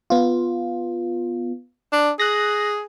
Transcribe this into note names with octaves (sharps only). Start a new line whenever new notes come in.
B3 F4
D4
G#4 F#6 A#6